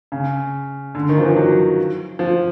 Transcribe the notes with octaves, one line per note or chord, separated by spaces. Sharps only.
C#3
D3
D#3
F3
E3
F#3
F3